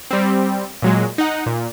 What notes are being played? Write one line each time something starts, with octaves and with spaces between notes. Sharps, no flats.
G3 C4
A#2 F#3 G#3
D#4 F#5
A#2